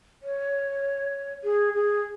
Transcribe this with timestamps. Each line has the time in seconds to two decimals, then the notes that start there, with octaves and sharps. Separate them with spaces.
0.22 C#5
1.44 G#4
1.73 G#4